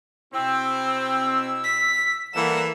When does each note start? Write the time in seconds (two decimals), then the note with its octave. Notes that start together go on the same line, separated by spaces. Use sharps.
0.34 B2 C4 E4 E6
1.64 B6
2.34 E3 G3 A#3 A4 E5 F#5 E7